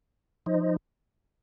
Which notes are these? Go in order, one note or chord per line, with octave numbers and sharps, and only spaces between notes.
F3 D#4 C5 D#5